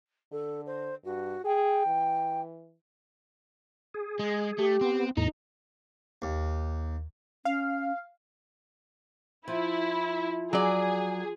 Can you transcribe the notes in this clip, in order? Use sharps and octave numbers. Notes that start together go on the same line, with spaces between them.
D3 A4
C5
G2 F#4
G#4 G5
E3
G#4
G#3
A3 G4
B3 C4
E2 A2 D#4 A#5
D#2
C#4 F5
F3 E4
F#3 G#4 D5